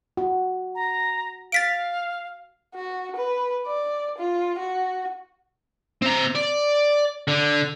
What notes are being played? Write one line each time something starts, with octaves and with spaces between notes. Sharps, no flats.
F#4
A#5
F5 A6 B6 D7
F#4
B4
D5
F4
F#4
C4 A#5
D5
D3